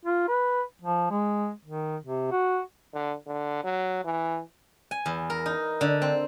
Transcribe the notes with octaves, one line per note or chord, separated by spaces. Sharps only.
F4
B4
F3
G#3
D#3
C3
F#4
D3
D3
F#3
E3
G#5
E2
A#4
D#4
D3
C4